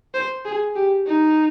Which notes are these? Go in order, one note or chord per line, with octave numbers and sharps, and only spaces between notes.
C5
G#4
G4
D#4